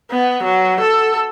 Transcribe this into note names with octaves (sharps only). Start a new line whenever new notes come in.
B3
F#3
A4